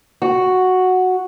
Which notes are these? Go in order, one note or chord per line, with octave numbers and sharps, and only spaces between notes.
F#4